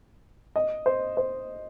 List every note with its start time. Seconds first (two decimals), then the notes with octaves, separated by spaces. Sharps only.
0.56 D#5
0.86 C5
1.17 C5